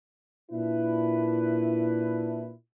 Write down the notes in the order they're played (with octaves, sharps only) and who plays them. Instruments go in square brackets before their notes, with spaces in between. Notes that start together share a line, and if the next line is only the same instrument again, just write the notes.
[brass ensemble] A#2 D4 E4 B4